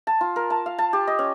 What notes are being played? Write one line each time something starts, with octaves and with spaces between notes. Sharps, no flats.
A5
F4
A#4
A5
F5
A5
G4
D#5
C#4